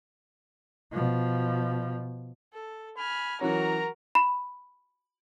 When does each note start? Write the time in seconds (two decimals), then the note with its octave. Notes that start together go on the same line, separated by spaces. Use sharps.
0.92 B2 F3
2.53 A4
2.97 G#5 B5 F6
3.41 E3 F#3 C#4 F#4 A#4 A#5
4.15 B5